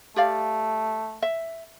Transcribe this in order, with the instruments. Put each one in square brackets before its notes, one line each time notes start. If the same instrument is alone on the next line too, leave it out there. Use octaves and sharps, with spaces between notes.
[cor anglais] A3 [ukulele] G4 D5 F5
[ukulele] E5